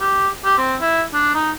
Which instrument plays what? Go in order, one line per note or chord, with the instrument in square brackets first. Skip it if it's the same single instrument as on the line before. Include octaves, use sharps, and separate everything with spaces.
[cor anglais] G4
G4
C4
E4
D4
D#4